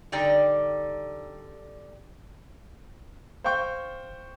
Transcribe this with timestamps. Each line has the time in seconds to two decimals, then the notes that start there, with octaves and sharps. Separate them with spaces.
0.12 D3 G3 D#4 D5 G5
3.44 C5 F5 G5 C#6 G6